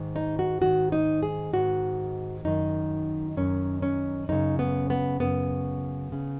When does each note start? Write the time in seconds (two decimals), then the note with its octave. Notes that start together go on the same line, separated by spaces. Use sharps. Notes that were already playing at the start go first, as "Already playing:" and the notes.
Already playing: G#2 D#3
0.16 D#4
0.39 F#4
0.61 G#2 D#3 F#4
0.92 D#4
1.23 G#4
1.53 G#2 D#3 F#4
2.45 F#2 D#3 D#4
3.37 F#2 D#3 C#4
3.82 C#4
4.29 F#2 C#3 D#4
4.59 B3
4.90 B3
5.20 F#2 C#3 B3
6.12 C#3